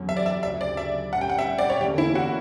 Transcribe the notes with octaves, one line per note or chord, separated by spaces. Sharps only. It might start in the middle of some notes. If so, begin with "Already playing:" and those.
Already playing: E2 D3 F#3 C#4
E5
D5
E5
D2 C#3 F#3 E5
D5
E5
A#2 G3 C#4 F#5
G5
F#5
E5
D5
C#5
E2 D3 A#3 C#4 G4
E4
F#4